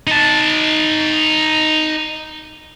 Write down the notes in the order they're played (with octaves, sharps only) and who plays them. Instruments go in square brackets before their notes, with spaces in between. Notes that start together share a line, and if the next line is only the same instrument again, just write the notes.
[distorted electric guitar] D#4 A5